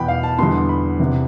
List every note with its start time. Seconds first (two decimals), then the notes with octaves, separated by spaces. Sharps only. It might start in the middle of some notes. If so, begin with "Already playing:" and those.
Already playing: E2 B2 B3 G5 B5
0.08 F5
0.23 A5
0.39 E2 D3 G3 B3 C6
0.69 B5
1.00 E2 C3 E3 B3